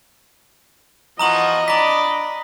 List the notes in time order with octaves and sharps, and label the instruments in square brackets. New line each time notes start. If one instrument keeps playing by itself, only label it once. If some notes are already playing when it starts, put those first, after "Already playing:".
[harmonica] E3 F3 F#4 [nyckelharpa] D#5 [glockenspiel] A#5 D#6 F#7
[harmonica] D4 D5 B5 [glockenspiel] A#5 B6